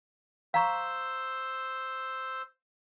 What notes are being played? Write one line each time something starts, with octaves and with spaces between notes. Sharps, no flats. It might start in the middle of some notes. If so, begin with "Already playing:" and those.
C5 F5 A#5 C#6 E6